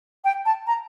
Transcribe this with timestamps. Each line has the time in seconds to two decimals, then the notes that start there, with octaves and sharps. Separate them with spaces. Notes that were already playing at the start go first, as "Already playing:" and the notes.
0.24 G5
0.45 A5
0.67 A#5